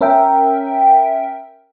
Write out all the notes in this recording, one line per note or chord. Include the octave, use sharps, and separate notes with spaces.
C#4 A#4 E5 G5